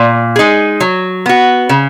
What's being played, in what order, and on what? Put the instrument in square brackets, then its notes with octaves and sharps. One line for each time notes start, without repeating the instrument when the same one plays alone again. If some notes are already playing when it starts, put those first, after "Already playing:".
Already playing: [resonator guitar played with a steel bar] A#2
G#3 D#4 G#4
F#3
B3 F#4
C#3